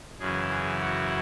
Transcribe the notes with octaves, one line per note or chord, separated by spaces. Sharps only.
F#2 C#3 E3 G#4
G#4
F#4